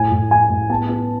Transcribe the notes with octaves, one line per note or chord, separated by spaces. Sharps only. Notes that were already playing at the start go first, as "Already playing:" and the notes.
Already playing: A2 G#5
A2
A2 G#5
A2
B3 A5
B3